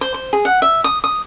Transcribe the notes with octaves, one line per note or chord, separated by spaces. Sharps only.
C5
C5
G#4
F#5
E5
D#6
D#6